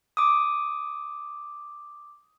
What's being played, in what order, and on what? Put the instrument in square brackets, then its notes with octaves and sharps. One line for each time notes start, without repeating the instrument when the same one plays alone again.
[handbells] D6 D#6